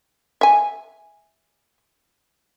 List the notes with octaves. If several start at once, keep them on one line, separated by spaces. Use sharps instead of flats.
E5 G#5